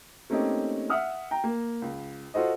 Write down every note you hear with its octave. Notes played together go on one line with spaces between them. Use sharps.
A3 A#3 C4 C#4 D#4 G4
E5 F#5 D#6 F6
G5 A#5
A#3
C#2
F4 F#4 A4 C5 D#5